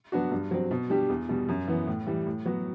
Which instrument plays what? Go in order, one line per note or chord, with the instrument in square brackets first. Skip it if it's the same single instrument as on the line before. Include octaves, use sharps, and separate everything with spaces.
[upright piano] F#3 B3 D4 F#4
G2
F#3 C4
B2
G3 D4 G4
E2
B2 G3
F#2
E3 B3
A2
E3 G3
A2
F#3 B3 F#4